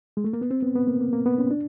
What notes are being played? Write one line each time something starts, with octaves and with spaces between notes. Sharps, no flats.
G#3
A3
A#3
B3
C4
B3
B3
A#3
A#3
A#3
B3
C#4
D4